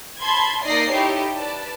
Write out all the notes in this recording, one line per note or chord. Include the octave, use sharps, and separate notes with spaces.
A5 B5 C6 G#6
A#3 D#4 D5 D#5 A#6 C7
D#4 E4 G4 A4 C#5
B4 D5 A5